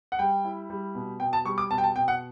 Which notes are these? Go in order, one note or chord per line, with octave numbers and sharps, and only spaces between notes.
F#5
G3 G5
E4
G3
B2
B2 G5
A5
G3 C#6
D6
B2 A5
G5
A5
B2 G5
F#5